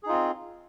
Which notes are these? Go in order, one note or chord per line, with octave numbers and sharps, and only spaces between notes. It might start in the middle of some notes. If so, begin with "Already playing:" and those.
C4 D#4 F4 G#4